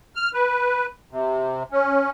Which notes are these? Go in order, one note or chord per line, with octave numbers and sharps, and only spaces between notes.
F6
B4
C3
C#4